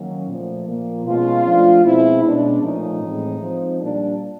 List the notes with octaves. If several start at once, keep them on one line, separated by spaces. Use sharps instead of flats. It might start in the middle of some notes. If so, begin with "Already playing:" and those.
Already playing: D#3 F#3 A#3 C#4
A#2 F3 A3
A#2 F3 A#3
B2 G#3 C#4 F4
F3 A3 D4
B2 G#3 C4 E4
B2 G#3 C#4 D4
A#2 F3 A3 C#4 D#4
A2 E3 G#3 C4
F3 G#3 C4
A#2 G3 A#3 D4